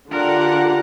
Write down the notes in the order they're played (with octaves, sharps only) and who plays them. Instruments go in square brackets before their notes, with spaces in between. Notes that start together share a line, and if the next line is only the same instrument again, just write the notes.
[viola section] D3 G4 F#5 [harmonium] D4 [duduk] F4 [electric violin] A#4